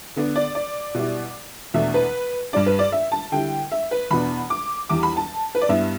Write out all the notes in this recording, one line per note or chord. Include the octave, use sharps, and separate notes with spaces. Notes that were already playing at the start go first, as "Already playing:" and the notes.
D3 B3 D4
D5
D5
B2 G3 E4
E2 B2 A3 D4 E5
B4
G2 G3 D4 D5
B4
D5
E5
A5
D3 G3 E4 G5
E5
B4
E2 B2 B3 D4 B5
D6
E2 E3 G3 D6
B5
A5
B4
D5
G2 G3 B3 E4 E5